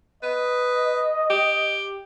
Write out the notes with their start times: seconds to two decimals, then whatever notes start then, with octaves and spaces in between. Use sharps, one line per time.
0.23 B4 D#5
1.30 G4